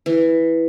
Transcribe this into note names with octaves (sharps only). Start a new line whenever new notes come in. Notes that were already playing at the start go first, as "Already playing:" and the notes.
E3